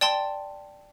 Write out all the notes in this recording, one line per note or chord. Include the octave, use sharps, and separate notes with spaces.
D5 G5 A5 C6